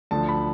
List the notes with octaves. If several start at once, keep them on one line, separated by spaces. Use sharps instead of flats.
D2 D3 F3 A5
B5